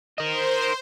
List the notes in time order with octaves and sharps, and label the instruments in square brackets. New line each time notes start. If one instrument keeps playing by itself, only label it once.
[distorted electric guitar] A#4 D#5 [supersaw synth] C5